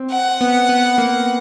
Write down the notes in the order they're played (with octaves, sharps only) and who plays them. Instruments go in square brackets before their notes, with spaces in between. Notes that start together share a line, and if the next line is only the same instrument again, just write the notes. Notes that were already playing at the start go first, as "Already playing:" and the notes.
Already playing: [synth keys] C4
[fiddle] F#5
[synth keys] B3
B3
A#3